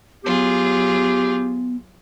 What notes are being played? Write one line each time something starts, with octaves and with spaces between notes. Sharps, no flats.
F#3 B3 F4 G4 G#4